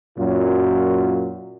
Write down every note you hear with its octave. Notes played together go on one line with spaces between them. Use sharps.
F#2 A#2 F#3 F4